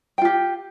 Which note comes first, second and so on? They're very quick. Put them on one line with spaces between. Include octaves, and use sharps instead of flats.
G5 F4 G4